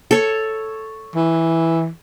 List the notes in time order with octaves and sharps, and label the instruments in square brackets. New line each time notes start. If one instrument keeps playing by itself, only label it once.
[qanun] A4 C#5
[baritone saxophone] E3